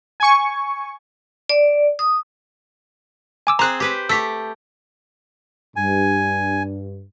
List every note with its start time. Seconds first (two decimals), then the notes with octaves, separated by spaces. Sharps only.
0.20 G#5 C#6
1.50 D5
1.99 D#6
3.47 G#5 D6 E6
3.59 C4 G#4 C5 A#5 F#6
3.80 G4 B4 C5
4.09 A3 G4 E6 B6
5.76 G2 G#5